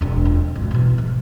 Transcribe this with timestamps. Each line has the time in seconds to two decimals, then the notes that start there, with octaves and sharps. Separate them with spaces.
0.01 E1 D4
0.25 F2
0.56 G#1
0.71 B2 E3
0.98 G#2